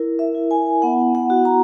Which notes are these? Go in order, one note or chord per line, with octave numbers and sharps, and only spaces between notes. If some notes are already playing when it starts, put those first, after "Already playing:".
Already playing: E4 A#4
E5
E4
G#5
B3 F#5
F#5
F#4
A#5